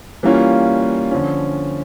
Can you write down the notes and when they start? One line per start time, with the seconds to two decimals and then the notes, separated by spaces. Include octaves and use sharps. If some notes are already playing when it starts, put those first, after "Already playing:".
0.23 E3 G3 A#3 C#4 F4
1.11 D3 F3 C#4